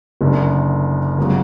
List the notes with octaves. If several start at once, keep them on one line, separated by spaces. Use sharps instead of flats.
F#1 F#2 D3
G1 C#3 F#3